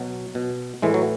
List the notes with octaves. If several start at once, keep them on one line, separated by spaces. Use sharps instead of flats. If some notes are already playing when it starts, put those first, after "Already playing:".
Already playing: B2 F#3
B2
A2 E3 G#3
F#3